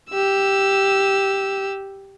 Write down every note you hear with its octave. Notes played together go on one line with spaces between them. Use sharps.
G4 E6